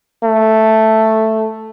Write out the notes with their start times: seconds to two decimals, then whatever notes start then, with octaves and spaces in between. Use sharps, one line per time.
0.24 A3